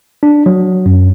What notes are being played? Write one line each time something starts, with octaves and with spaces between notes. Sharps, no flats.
D4
F#3
F#2